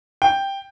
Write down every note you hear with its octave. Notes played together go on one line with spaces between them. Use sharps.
G5